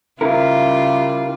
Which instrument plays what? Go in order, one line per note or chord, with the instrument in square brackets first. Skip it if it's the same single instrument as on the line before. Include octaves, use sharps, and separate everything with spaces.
[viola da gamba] C#3 G3 F4 [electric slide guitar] E4 A#4